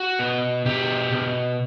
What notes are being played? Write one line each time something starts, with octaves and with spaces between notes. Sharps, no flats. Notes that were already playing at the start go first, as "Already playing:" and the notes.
Already playing: F#4
B2
B2 G4
B2